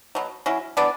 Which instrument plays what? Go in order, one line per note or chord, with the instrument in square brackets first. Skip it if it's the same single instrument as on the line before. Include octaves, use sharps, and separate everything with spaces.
[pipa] B2 F#3
F#3 C#4 E4
E3 B3 D4 D5